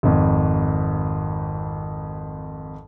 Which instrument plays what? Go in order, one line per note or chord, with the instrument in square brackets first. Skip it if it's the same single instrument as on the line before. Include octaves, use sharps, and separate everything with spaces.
[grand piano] G#1 F2